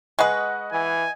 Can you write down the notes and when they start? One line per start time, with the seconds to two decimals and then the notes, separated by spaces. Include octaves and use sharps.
0.19 G#3 B4 D#5 F#5 C#6
0.72 E3 G#5